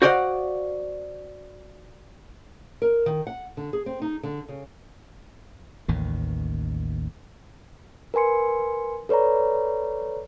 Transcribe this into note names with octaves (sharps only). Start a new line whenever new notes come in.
F#4 C5 D5 D#5 F5 F#5
A#4
D#3
F#5
D3
G#4
C4
D#4
D3
C#3
A1 D#2 D#3
A#4 B4 G#5 C6 C#7
A4 B4 C#5 D5 A#5